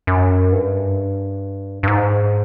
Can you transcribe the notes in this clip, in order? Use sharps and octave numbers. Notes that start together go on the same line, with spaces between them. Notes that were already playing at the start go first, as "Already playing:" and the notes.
F#2
G2
G2
G#2